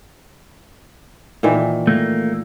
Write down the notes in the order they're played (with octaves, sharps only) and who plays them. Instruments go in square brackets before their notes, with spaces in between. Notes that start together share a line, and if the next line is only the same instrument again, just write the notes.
[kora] A#2 D#3 E3
[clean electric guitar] A3 A#3